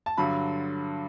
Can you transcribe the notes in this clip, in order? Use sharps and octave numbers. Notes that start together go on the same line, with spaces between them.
A5
G2 D3 F#3 B5